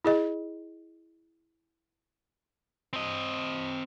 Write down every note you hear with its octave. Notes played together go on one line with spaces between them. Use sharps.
E4 G#4 D#5
C4 D#5